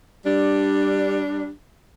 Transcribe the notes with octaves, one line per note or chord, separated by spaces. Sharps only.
G3 D4